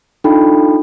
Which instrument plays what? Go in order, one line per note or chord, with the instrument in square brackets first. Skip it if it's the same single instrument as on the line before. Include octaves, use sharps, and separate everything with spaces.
[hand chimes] D4 D#4 F4 A4 G5 B5